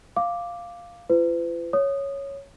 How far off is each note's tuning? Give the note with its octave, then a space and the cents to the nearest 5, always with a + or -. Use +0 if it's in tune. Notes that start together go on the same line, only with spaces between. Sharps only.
F5 +0 D6 +0
F4 -40 B4 +45
C#5 +0 D#6 -15